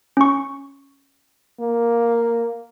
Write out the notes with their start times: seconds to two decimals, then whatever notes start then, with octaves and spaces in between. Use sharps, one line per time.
0.17 C#4 C#6
1.60 A#3